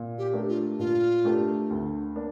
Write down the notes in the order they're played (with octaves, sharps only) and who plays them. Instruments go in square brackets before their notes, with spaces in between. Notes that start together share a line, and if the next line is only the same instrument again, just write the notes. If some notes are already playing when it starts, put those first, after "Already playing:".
Already playing: [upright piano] A#2
[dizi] G4
[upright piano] A3 D4 G4 A#4
[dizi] F4
[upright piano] A#2 [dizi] F4
[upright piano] A3 D4 G4 A#4
D2
A#3 D4